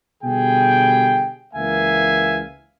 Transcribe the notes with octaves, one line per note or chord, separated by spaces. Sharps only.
B2 D3 G3 G#4 G5
C#2 E3 A#3 E5 F5 G#5